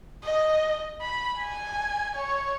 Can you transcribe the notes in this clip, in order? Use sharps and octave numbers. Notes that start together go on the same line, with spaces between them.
D#5
B5
G#5
C#5